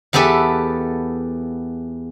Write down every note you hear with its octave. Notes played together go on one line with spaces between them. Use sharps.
E2 B3 G4 A4 E5